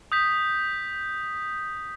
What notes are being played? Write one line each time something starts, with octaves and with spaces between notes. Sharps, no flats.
D#6 G6 B6